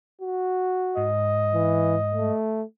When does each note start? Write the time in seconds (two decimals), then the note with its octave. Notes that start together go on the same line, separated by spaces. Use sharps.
0.21 F#4
0.97 G#2 D#5
1.54 E3
2.14 A3